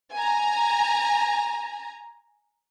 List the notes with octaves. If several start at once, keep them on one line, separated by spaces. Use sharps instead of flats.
G#5 A#5